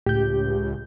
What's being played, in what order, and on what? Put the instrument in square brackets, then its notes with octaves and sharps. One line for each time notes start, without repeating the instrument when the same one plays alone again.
[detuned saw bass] C#2 [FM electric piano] A2 G6 [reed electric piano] G4